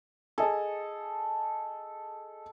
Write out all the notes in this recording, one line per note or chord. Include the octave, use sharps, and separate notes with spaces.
G#4 A4 D#5 G#5